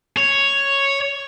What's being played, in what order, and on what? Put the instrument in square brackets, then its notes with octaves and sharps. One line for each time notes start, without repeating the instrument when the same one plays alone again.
[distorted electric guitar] C#5